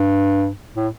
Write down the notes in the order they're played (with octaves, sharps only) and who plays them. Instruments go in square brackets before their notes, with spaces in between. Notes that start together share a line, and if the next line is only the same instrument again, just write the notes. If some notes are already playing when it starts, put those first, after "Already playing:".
Already playing: [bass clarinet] G2
A2